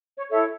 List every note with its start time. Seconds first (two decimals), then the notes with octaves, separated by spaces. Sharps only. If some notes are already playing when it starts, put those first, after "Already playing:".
0.17 C#5
0.29 E4 A4 C#5 E5